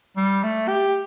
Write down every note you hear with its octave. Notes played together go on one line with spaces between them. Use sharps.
G3
A3
G4